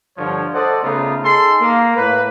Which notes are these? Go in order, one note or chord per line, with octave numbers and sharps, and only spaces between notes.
G2 D3 F3 C#5
A4 C5 D5 D#5 F#5
C#3 A3 B3 D#4 F4
D#4 G#4 A4 C6
A#3
A2 A#3 B4